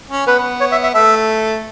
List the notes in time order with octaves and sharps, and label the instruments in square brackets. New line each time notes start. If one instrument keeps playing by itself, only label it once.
[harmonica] C#4
[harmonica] B3 [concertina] B4
[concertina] C#5
E5
E5
[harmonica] A3 [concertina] E5